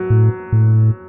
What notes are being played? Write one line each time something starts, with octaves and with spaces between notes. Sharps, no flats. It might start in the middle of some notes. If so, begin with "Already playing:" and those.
Already playing: F#3
A2
A2